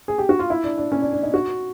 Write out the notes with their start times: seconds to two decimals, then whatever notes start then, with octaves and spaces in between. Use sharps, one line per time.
0.08 G#4
0.18 G4
0.29 F#4
0.39 F4
0.50 E4
0.64 D4
0.78 D4
0.92 C#4
1.02 D4
1.13 D4
1.23 D#4
1.34 F#4